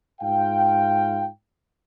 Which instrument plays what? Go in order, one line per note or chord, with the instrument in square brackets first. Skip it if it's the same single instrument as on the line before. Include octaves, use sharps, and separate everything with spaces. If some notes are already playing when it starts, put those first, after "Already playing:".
[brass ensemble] G#2 F4 F5 G5